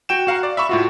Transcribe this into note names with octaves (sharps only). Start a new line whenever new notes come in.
F#4 G5 E7
F#4 F5 F#5 A#5
D5
E5 B5 C#6 E7
A2 F4 F#4